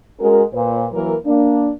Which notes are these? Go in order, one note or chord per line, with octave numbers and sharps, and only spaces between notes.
G#3 C#4 F#4 A#4
A#2 B4 C5
E3 F#3 A#3 A#4
A#3 D4